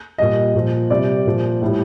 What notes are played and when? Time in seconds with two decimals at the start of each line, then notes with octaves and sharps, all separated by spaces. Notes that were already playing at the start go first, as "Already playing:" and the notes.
0.18 A#2 G3 D#5
0.55 A#2 F3
0.90 C3 G3 D5
1.26 A#2 F3
1.62 A2 G3